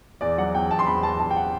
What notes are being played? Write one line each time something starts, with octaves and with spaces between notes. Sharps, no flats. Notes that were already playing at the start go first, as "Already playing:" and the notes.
E2 D5
F#3 F#5
E2 G5
E2 A5
C6
E2 B5
E2 A5
E2 A5
G5
F#5